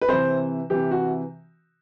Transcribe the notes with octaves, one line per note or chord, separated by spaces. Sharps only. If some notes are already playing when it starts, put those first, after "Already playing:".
B4
C3 E3 C5
C3 E3 G4
F#4